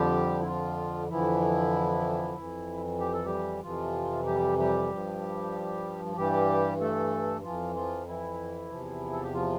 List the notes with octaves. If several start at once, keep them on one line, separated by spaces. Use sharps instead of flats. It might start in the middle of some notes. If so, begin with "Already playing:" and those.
Already playing: F2 D3 F3 G3 G4
E4
F3 F4
F2 D3 E3 F3 E4
F2 E3
G4
A4
G3 G4
F2 C3 E3 F3 F4
G3 G4
G3 G4
G2 F3
G2 E3 G3 G4
A3 A4
F2 E3 F3 F4
F3 F4
E3 E4
E2 C3 F3
A4
G4
F3 F4